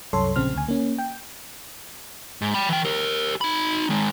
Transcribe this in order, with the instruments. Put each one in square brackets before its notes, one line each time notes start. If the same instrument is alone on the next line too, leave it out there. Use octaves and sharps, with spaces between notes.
[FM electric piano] C2 F#2 A4 C#5 C6
A#1 C#3 C4 F6
D2 G#5
A#3 C#4
G5
[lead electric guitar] G#2
G5 B5
E3 G5
G4 A#4
D#4 B5
D#3 G#3